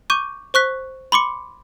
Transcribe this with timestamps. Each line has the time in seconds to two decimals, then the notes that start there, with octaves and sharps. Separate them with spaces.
0.10 C#6 D6 G6 D#7
0.54 C5 C#6 F#6 B6
1.12 B5 C6 D6 C#7